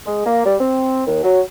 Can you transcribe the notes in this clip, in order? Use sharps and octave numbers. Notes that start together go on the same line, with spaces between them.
G#3
A#3
G3
C4
D#2
F#3